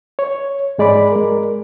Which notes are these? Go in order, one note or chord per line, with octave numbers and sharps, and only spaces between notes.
C#5
G#2 G#3 D5 B5 D6
G#3 A#4